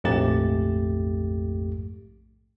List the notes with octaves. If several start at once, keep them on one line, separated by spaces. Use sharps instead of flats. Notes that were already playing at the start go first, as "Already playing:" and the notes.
A#1 F2 G#2 A3 G4 A6